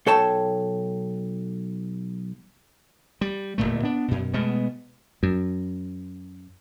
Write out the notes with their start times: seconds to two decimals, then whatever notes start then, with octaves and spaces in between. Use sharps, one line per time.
0.06 B1 A4 C#5 G5 A5
3.21 G3
3.58 D1 B1 A#2 A3
3.83 B3 D4
4.08 F#2 B2
4.33 B2 G#3 A3 B3
5.23 F#2